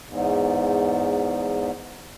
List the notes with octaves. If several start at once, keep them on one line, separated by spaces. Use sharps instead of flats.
E2 G#2